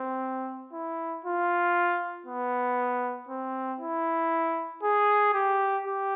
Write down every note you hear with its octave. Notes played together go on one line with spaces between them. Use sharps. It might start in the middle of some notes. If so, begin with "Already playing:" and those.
Already playing: C4
E4
F4
B3
C4
E4
G#4
G4
G4